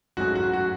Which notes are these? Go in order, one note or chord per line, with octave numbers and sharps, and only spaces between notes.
G#2 F#3 A3 C#4 F#4 G#4
F#4
F#4